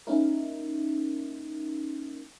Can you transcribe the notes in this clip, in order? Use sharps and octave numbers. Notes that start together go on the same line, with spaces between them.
A#3 C#4 D#4 E4 A#4